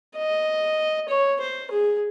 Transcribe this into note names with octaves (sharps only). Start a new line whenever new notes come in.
D#5
C#5
C5
G#4